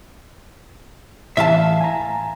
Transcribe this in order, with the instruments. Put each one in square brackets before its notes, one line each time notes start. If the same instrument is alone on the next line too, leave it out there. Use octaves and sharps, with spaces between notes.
[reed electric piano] A2 E3 [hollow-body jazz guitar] E5 F5 A5
[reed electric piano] G#5 A#5